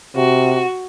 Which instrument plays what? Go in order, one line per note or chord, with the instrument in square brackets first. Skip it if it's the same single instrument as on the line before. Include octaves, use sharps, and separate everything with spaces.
[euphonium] C3 [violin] F#4